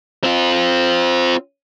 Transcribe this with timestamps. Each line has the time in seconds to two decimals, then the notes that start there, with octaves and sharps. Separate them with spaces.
0.24 C4 F4